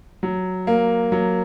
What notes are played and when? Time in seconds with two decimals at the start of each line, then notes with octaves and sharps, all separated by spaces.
0.23 F#3
0.67 A#3
1.12 F#3